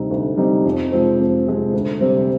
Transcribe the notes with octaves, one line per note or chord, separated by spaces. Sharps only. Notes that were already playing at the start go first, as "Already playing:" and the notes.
Already playing: D2 C3 G3 C4 D#4
D2
C3 G3 C4 D#4
F2
C3 F3 G#3 C4
F2
C3 F3 G#3 C4
D2
C3 G3 C4